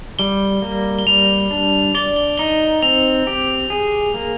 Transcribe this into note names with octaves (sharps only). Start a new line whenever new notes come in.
G3 G7
A#3
G7
G3 F7
D4
D5 G7
G7
D#4 G7
C4 F7
G4
G#4
A#3